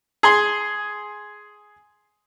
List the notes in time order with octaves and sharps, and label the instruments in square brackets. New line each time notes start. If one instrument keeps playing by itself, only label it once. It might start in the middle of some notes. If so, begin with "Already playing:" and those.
[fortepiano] G#4 G#5 C6